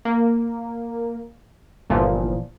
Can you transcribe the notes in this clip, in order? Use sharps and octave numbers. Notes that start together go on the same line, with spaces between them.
A#3
G1 A#2 E3 F3